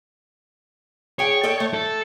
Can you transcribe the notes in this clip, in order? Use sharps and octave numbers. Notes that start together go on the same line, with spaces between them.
G#4 C#5 G5
A4 D#5 G5
A3
A4